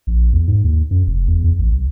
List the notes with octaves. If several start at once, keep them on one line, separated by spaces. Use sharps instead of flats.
A#1
E2
G#2
D#2
F#2
F1
E2
E2
A1
C2